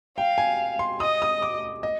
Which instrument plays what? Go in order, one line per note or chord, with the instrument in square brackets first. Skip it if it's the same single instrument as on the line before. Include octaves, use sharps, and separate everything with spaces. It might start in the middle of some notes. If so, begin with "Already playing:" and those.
[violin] F5 [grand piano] G5
[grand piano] G#5
C6
[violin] D#5 [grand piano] D#6
[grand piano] D#6
D6
D#5